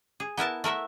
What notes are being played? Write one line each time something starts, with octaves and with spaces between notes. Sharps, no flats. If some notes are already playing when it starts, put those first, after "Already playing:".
G#4
B3 E4 A#4 A5
A3 A#4 E5 F#5